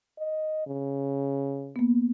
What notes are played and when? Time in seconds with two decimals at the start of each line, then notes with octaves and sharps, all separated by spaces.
0.18 D#5
0.66 C#3
1.76 A#3 B3